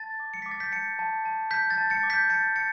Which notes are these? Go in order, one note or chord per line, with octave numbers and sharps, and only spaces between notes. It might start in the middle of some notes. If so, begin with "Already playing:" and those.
Already playing: A5 A6
D6
C#7
D6 B6
A6
G6 B6
A5 A6 C#7
A5
A5
A5 G6 B6
A6
A5
A6 C#7
D6
G6 B6
A5 A6 C#7
A5 A6 C#7